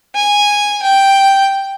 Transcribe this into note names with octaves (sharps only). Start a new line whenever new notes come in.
G#5
G5